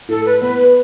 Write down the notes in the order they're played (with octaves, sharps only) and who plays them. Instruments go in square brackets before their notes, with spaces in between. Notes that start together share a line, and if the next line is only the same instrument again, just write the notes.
[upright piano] A2 [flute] A4
[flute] B4
[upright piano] B3 [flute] B4
[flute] B4